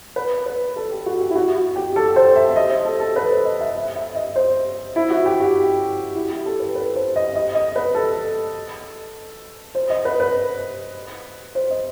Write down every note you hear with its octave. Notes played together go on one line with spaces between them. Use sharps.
B4
B4
A4
G4
F#4
G4
E4
F#4
F#4
G4
A4
C5
E5
E5
D#5
C5
A4
A4
B4
C5
D#5
E5
E5
E5
D#5
C5
E4
F#4
G4
F#4
E4
G4
A4
B4
B4
C5
D#5
D#5
D#5
B4
A4
C5
D#5
B4
B4
C5
D#5